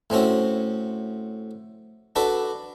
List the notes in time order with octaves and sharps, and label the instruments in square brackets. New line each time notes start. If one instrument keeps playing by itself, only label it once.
[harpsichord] A2 C4 C#4 F#4
D4 F#4 A4 B4